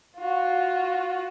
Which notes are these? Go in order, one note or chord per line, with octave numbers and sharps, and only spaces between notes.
F4 F#4